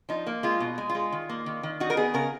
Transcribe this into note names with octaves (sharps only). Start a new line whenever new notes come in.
F3 D#4
A#3
G#3 F4
B2
G#3
F4
G#3
D#3
A#3
D#3
D#3
D#4 F#4
A#4
B3 G#4
C#3 A#4